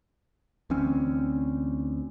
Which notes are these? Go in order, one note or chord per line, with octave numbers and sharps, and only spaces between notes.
D2 E3 C4 C#4